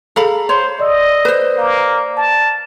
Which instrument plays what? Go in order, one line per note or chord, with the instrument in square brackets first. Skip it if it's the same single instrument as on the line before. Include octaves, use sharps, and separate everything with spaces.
[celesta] G#4 A#5 [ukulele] A4 F5 B5
[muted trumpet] C5 [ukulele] C#5
[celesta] D5 E6 [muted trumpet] D#5
[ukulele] B4 C5
[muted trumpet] A#3
A5